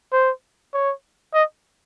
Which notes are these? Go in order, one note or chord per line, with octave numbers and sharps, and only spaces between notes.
C5
C#5
D#5